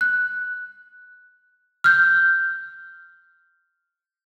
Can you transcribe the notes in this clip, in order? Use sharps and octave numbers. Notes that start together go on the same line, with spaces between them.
F#6
F6 G6